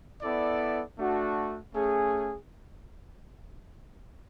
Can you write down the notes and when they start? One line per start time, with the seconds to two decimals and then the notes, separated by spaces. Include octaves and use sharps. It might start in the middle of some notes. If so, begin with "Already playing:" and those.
0.22 B3 E4 A4 D5
0.98 A3 D4 F#4
1.74 A3 C#4 G#4